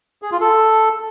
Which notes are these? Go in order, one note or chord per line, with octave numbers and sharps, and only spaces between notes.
G#4
F4
A4